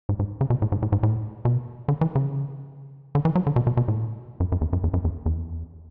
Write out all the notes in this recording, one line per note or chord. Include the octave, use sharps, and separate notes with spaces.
G#2
G#2
C#3
B2
A2
G#2
A2
G#2
A2
B2
D3
E3
C#3
D3
E3
F#3
D3
B2
B2
B2
A2
F#2
F#2
E2
F#2
E2
F#2
E2
E2